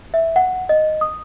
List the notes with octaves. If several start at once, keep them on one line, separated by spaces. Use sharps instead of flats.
E5
F#5
D#5
D#6